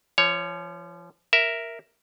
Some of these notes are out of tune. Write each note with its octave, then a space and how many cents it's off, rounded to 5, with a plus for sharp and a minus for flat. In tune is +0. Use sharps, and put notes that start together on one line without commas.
F3 -35 C#5 +5
A#4 +0 E5 +0